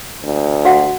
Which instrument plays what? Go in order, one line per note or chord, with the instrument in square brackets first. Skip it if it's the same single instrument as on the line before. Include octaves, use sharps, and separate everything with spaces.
[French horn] D2
[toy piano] F#4 F5 F#5